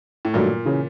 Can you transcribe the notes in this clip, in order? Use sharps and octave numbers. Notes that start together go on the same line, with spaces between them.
A2
G2 A#2 D#3 F#3 A3
C#3 E3